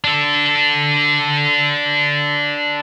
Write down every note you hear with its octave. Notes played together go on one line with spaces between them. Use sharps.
D4 A4